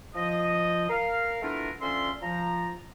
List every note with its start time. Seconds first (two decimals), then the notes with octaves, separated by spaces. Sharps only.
0.14 F3 D#5
0.89 A#4 F5
1.42 A3 B3 D4 E4 F4 A#4
1.81 D3 F3 C#4 D5 E5 C6
2.22 F3 A#5